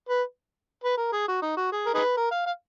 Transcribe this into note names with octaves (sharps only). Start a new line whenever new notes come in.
B4
B4
A#4
G#4
F#4
D#4
F#4
G#4
A#4
D#4 G#4 B4
A#4
F5
F5